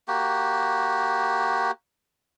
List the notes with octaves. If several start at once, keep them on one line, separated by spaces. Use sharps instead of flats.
A#3 F#4 G4